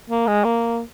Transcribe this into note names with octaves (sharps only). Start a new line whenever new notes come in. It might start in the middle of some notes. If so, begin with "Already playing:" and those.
A#3
G#3
A#3